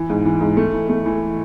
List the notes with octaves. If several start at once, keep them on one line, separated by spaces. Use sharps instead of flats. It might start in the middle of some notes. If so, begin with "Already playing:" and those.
Already playing: E3
G#2
E3
G#2
A3
E3
A3
E3